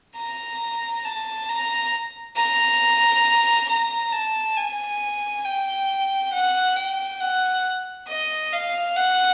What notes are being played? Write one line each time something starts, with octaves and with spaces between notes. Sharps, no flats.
A#5
A5
A#5
A#5
A#5
A5
G#5
G5
F#5
G5
F#5
D#5
F5
F#5